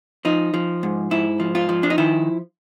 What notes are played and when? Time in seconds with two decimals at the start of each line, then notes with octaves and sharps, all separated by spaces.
0.25 F3 D#4
0.54 F3
0.83 G#2
1.11 G#2 E4
1.40 F3
1.55 F4
1.69 F3
1.83 D4
1.90 D#4
1.98 D#3 E4